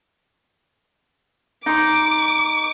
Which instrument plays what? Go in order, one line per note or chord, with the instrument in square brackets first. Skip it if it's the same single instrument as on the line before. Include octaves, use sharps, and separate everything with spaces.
[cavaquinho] D#4 C6 [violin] D6